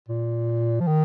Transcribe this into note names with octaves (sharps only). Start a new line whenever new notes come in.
A#2
F3
D#3